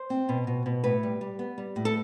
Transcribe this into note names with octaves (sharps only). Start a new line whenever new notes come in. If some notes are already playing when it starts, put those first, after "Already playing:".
Already playing: C5
C4
B2
B2
B2
A2 B4
G3
G3
B3
G3
A2
A4